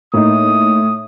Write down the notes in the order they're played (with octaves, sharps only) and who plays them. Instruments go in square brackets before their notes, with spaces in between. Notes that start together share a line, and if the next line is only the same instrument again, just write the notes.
[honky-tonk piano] A2 [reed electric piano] A#3 D#4 [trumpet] D#6